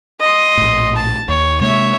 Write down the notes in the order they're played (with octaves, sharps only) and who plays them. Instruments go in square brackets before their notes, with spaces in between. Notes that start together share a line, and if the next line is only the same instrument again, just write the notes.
[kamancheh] D#5 C6
[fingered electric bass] A#1 A2
[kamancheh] A5
[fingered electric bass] D#2 [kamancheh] C#5
[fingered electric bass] C3 G#3 A#3 [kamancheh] C#5 E5